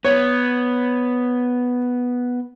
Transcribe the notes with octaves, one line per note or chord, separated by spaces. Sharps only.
B3 C#5